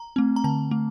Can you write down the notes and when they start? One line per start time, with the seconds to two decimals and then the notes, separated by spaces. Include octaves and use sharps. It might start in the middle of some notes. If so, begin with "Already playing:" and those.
Already playing: A#5
0.16 A3 C4
0.36 A#5
0.44 D3 A5
0.71 A3